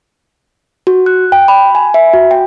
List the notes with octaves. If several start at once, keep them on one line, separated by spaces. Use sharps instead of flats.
F#4
F#6
G5
B5
G#5
E5
F#4
G5